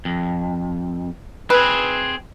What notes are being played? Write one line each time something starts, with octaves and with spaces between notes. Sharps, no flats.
F2
C4 G#4 B4